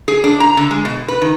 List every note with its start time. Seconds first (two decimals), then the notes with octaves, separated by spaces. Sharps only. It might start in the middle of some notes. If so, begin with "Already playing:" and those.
0.08 G#4
0.24 D4
0.40 A#5
0.57 D3
0.71 G#3
0.85 B2
1.08 B4
1.22 D#3